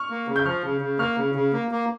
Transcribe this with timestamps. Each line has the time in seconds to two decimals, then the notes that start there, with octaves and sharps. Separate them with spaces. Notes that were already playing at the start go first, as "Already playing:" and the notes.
Already playing: C#6 F6
0.10 A#3
0.27 C#3
0.36 G6
0.45 F3 C#6 F6
0.64 C#3
0.81 C#3
0.99 A#3 C#6 F6
1.17 C#3
1.35 C#3
1.53 A#3
1.71 A#3